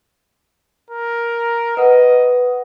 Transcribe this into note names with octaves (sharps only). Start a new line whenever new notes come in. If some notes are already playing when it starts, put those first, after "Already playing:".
A#4
B4 D#5 F#5